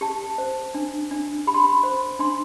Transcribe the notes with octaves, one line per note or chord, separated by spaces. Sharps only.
G4 A5
C5
D4
D4
G4 B5
C6
B5
C5
D4 C6